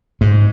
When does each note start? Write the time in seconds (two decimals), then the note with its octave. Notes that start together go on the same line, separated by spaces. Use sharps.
0.21 G#2